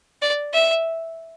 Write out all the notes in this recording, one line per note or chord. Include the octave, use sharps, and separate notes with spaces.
D5
E5